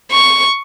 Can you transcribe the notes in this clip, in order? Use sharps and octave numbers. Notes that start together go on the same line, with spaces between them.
C#6